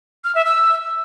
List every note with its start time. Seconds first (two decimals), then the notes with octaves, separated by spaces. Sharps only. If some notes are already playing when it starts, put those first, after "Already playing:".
0.24 F6
0.35 E5
0.46 E6